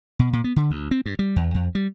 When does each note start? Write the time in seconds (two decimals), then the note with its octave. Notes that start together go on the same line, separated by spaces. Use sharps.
0.19 B2
0.33 A#2
0.44 B3
0.56 D3
0.71 D2
0.91 C4
1.06 G2
1.19 G3
1.36 E2
1.54 F2
1.75 G3